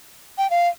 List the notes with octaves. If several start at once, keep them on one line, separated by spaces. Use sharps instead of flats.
G5
F5